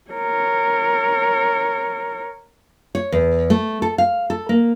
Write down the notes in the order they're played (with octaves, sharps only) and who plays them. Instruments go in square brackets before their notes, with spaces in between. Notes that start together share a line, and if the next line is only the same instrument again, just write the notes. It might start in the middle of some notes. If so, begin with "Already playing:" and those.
[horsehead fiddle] A#4 C#5
[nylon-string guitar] C#5
E2
A3
A4
F5
A4
A#3